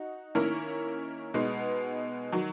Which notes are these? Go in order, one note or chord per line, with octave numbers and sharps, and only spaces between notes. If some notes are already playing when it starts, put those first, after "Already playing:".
Already playing: D#4 F#4
D#3 A#3 C#4 E4 A#4
B2 G#3 B3 D#4
D#3 F#3